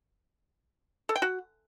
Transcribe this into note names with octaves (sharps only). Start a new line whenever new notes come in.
A4
G5
F#4